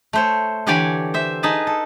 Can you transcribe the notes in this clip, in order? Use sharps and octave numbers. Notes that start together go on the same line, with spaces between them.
A3 C5 C#5
D3 E3 G4 C#5 D5 G#5
C5 E5
D#4 G#4 B4 A5
A4